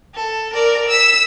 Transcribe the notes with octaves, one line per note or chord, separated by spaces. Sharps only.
A4
A#4 D5
E6 B6